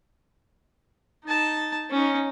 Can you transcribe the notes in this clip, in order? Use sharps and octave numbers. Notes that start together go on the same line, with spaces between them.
D#4 A5
C#4 D#4